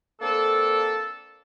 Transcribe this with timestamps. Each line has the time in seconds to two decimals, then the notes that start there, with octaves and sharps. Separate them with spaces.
0.21 A#3 C4 D4 A4